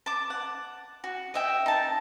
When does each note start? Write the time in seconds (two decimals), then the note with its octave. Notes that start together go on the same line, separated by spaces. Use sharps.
0.06 A5 D6
0.30 F#5
1.04 F#4
1.34 D#5 E5 G5
1.66 D#4 A5